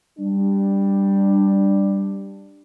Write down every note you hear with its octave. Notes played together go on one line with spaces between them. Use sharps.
G3 D4